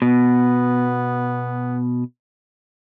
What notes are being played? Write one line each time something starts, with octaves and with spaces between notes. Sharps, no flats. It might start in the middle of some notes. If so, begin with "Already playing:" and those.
B2 B3